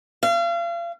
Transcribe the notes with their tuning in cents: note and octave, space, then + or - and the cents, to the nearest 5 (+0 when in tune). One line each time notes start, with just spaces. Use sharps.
F5 -35